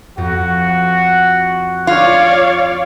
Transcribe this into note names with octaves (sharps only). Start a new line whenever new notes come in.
F2 F#4
F4 C#5 D5 F5